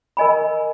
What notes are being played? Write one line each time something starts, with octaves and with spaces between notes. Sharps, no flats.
A#4 D#5 G#5 B5